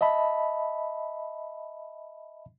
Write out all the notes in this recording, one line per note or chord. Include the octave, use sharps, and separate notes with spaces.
D#5 E5 A5 B5